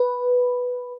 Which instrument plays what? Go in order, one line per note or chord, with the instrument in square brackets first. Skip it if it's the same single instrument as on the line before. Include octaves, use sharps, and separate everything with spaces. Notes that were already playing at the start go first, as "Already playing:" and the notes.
Already playing: [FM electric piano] B4